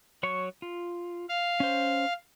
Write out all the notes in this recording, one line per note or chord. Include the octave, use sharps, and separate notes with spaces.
F#3 C#5 C#6
F4
F5
C#4 C5